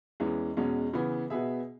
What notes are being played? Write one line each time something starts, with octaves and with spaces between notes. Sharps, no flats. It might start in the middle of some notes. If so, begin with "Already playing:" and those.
E2 E3 G#3 C#4
E2 B2 G#3 C#4
C#3 E3 B3
B2 B3 G#4 E5